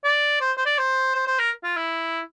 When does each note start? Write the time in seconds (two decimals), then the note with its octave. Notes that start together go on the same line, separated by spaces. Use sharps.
0.04 D5
0.41 C5
0.57 C5
0.66 D5
0.79 C5
1.15 C5
1.27 C5
1.39 A#4
1.64 F4
1.77 E4